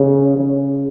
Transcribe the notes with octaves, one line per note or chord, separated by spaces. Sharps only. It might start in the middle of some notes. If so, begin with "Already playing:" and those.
Already playing: C#3
C#3